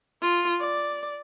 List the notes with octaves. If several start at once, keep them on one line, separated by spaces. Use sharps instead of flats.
F4
D5